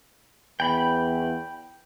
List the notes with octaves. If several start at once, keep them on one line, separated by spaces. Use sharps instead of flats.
E2 G5 B5